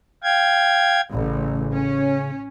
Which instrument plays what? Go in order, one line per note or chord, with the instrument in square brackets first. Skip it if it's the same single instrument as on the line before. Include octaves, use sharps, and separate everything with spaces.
[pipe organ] F5 G5 G#6
[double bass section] A1 [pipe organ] C#3
[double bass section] C#4